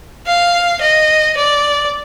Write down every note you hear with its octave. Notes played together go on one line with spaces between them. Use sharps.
F5
D#5
D5